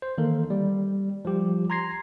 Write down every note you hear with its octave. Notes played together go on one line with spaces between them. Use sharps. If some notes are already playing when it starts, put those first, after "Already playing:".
C5
D#3 E3 A#3 A4 A#4
G3
F3 G3 G4
A#5 C6 G#6 A#6 C7